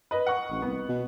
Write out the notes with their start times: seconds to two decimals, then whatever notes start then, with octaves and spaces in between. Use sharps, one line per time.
0.11 B4 D#5
0.27 F#5 C#6
0.50 A1
0.62 C2 B3
0.89 B2